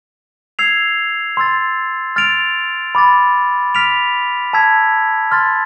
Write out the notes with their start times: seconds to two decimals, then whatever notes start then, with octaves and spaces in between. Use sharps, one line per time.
0.59 E6 G#6 C7 F7
1.37 C6 E6 A6
2.16 F6 A6 D7 F7
2.95 B5 D6 A6
3.75 F6 B6 D7 F7
4.53 A5 E6 G#6 B6
5.32 C6 F6 A6